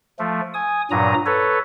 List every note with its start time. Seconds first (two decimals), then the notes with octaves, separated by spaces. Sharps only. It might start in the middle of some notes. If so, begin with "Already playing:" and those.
0.19 F3 A3
0.54 G#5 D#6
0.91 G2 A#2 F#3 A#5 D#6
1.26 A4 B4 C#5